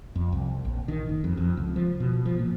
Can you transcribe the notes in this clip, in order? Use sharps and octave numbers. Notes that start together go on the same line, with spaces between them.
F2
C2
A#1
D#3
F#1
F2
F2
C#2
F3
B2
F3
A#2